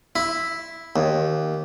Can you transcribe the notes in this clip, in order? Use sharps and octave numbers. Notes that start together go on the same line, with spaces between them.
E4
D#2